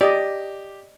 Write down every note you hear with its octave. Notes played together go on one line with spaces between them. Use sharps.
G4 D5 D#5